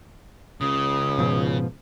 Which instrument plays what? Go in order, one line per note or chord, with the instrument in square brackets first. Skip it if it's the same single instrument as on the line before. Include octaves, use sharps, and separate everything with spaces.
[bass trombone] C#2 [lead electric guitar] C#3 [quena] D#6
[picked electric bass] G#2 B2 F3